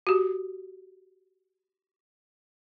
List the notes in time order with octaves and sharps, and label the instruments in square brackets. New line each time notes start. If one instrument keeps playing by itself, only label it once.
[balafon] F#4 G4